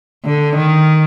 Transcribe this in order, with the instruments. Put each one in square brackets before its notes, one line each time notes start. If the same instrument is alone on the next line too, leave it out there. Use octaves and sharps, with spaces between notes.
[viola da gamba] D3
D#3